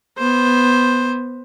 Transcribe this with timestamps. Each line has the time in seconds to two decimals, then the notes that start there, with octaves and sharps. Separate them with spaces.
0.18 B3 C5